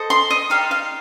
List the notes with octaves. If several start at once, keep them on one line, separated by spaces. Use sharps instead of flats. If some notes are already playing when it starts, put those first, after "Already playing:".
Already playing: A4 C5 D#5
C6
D#5
D#4 G4 D5 F5
F5